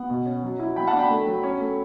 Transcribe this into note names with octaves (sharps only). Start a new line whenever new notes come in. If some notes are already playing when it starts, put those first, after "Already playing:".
Already playing: B3 F#5
B2
C#4
F#3
E4
F#3 G5 B5
F#5 A5
D4
G5 B5
A3
F#3
C#4
A3